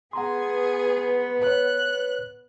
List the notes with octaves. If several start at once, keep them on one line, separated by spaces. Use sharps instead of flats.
B3 G#4 F#5 A#5 C6
B4 C#5 F#6